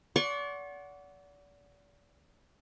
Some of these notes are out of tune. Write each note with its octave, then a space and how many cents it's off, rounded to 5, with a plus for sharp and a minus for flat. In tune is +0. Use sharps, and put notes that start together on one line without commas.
D5 -35 F#5 +0 C#6 -40